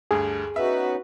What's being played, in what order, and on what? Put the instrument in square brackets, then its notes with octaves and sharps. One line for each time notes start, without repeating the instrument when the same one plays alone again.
[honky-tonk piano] D2 G2 [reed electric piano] G#4
[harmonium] B3 C#4 D#4 [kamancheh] F#4 B4 [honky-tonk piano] E5